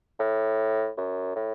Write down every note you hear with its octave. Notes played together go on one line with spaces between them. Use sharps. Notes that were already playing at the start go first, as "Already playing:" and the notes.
A2
F#2
A2